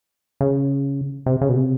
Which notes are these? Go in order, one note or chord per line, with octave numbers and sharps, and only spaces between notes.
C#3
C3
C#3
B2
C3